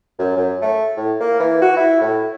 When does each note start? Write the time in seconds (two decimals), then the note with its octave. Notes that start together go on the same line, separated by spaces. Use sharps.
0.19 F#2
0.36 F#2
0.61 A3
0.96 A2
1.20 A#3
1.39 E3
1.61 F#4
1.76 E4
2.01 A2